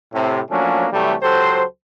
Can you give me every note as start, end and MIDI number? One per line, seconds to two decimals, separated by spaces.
0.14 0.40 45
0.14 0.40 48
0.51 0.87 53
0.51 0.87 54
0.51 0.87 57
0.51 0.87 58
0.51 0.87 61
0.51 0.87 62
0.93 1.15 48
0.93 1.15 52
0.93 1.15 54
0.93 1.15 55
0.93 1.15 57
1.22 1.64 37
1.22 1.64 54
1.22 1.64 67
1.22 1.64 69
1.22 1.64 72